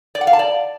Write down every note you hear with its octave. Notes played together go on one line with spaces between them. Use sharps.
D5
F#5
F5
A5
D5